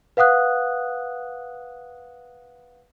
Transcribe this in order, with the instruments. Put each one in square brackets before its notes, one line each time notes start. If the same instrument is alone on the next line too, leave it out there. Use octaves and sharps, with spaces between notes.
[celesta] B4 F5 F#5 D#6 F#6